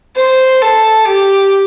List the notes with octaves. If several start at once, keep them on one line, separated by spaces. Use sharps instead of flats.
C5
A4
G4